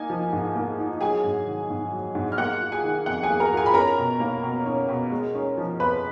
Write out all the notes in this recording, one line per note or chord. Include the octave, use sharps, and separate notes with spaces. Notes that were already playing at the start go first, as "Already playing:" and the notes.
Already playing: A#3 D#4 G#5
F3
G#2
A#3
D#4
F#3 G#4 G#5
G#2
D#3
G#2
F#3
G#2
F6
A#3 F#5 F#6
F4
G#4 G#5
D#3
F2 F#5
G#4 G#5
A#3
A#4 A#5
F4
G#4 G#5
B5
C#4 A#4 A#5
B2
A#3
B2
C#4
B2
G#3
C#4
F3
F2 B4 B5